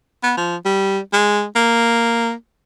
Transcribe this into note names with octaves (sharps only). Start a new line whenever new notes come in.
B3
F3
G3
G#3
A#3